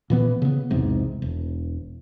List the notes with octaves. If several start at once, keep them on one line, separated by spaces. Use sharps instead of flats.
A#2 E3 B3
C#3 B3
B1 E2 G#2 C3
E1